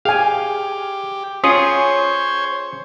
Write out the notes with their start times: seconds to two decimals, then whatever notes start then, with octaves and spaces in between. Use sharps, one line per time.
0.05 G4 G#4 F5 G5 G#5
1.44 C#4 F4 G#4 C5 C#5 D#6